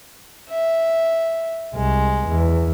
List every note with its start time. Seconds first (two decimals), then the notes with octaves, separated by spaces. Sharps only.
0.49 E5
1.74 C2 G#3
2.28 E2